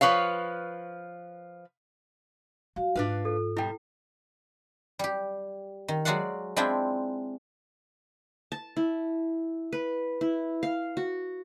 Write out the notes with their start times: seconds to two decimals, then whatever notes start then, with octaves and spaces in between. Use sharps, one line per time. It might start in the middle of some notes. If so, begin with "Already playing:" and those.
0.01 F3 B4 C#5 F5
2.76 F#3 F#4 F5
2.96 G#2 D4 F4 B4 F5
3.25 A4
3.57 B2 G3 E4 G5
4.99 G3 G4
5.88 D#3
6.05 F#3 G#3 F#4 D5 F5 F#5
6.56 G#3 C4 D4 E4 F4 G5
8.52 A5
8.76 E4
9.73 B4
10.21 E4
10.63 F5
10.97 F#4